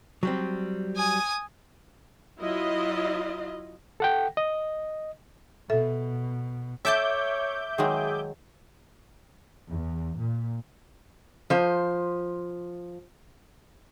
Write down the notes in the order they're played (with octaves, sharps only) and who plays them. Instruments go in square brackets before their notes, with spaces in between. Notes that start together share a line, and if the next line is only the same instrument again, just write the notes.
[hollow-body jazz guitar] F#3 G3 C4
[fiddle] G#5 D#6
[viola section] F#3 E4 F4 D#5
[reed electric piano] A4 F#5 G5
D#5
[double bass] B2 [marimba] A4 E5
[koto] A4 A5 [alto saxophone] C#5 [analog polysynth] E5 D6 G6
[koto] D#3 F#3 G#3 [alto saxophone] G#4
[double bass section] E2
A#2
[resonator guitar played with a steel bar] F3 C5